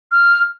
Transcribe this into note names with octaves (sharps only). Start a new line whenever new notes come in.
F6